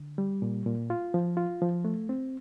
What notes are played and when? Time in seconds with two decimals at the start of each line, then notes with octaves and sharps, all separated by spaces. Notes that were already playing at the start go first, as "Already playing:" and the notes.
Already playing: D3
0.18 G3
0.42 A#2
0.66 A#2
0.90 F4
1.14 F3
1.37 F4
1.62 F3
1.85 A3
2.09 C4